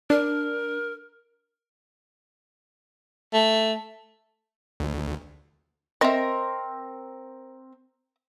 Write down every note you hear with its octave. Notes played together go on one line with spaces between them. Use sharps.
D4 A#4
A3
D2
C4 A#4 D#5 E5